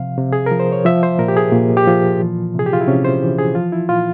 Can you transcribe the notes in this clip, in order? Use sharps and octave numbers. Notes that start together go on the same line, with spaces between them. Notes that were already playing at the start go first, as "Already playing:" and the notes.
Already playing: C3 F3 F5
C3
G#4
A#4
F3
C5
C#5
F3 E5
C5
A#2 A#4
G4
G#4
A#2
G4
F3 F4
E3
C3 G#4
G4
F4
E4
C3 C#4
C5
E3
G#4
F3 F4
E4
A#2 F4